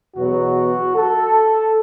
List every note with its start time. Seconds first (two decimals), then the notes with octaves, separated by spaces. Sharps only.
0.16 E2 B2 F#3 B3 F#4
0.95 A4